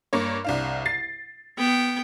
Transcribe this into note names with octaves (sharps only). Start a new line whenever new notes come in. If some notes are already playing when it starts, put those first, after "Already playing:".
G2 A#3 C#5
C2 D4 F5
A6 C7
B3 G5